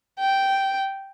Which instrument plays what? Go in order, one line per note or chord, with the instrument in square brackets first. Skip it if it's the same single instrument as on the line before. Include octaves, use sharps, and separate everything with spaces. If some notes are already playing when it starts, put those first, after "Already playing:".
[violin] G5